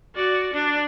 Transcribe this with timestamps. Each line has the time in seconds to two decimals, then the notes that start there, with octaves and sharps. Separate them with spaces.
0.15 F#4 D5
0.53 D4